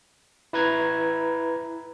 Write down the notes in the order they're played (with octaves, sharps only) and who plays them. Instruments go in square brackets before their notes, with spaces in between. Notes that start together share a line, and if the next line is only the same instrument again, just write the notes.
[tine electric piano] E4 B4 A#5 G#6